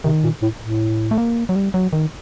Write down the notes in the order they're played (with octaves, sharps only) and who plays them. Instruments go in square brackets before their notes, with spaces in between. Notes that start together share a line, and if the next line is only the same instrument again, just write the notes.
[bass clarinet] C3 [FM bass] D#3
[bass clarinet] A#2
A2
A2
[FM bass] A3
A#3
F#3
G3
F#3
D#3